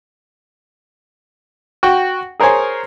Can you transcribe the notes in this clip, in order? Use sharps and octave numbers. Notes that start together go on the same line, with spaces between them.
F#4 G5
G#4 A#4 C5 C#5 G#5